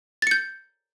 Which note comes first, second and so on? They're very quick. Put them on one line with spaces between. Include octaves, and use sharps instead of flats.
A6 C#7 G6